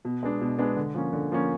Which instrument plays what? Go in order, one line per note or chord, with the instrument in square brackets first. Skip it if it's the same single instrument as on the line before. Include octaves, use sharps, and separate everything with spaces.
[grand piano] B2
G#3 B3 D4
B2
G#3 B3 D4
D3
F3 A#3 C#4
D3
F3 A#3 C#4